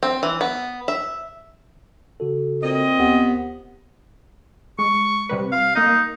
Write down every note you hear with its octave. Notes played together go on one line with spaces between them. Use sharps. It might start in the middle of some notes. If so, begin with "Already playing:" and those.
C4
E3
B3
E5
C#3 F#4 A4
A#2 C4 D#5
D2 B3 G4
G#3 C#6
C3 G3 B4
F5
A#3 D#4 D#5